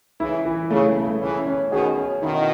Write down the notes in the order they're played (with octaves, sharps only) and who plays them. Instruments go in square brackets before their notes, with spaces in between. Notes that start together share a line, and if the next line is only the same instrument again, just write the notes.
[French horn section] C#3 E3 [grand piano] E4
[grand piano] E3
[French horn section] C#3 [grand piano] A3
[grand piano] A3
[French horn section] C#3 E3 [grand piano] C#4
[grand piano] C#4
[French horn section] B2 D#3 [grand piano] G#4
[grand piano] C#4
[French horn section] B2 D#3 [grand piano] E4